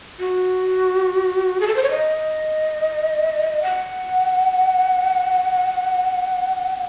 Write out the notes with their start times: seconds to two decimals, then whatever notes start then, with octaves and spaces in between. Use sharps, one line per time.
0.19 F#4
1.60 G#4
1.67 A4
1.76 C5
1.83 C#5
1.91 D#5
3.63 F#5